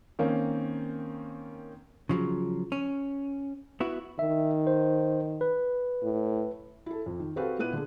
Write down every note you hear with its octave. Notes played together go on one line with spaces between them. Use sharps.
D#3 A#3 C4 C#4
C#3 F3 F#3
C#4
B3 E4 F#4
D#3 E5
C5
B4
A2
E4 A4
F2
D#3
C4 F#4 G4 A4 B4 F5
A#2 A#3 B3 E4 F#6 D#7
D3 G#4